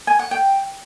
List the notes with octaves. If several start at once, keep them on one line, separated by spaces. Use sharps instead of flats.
G#5
F#5
G5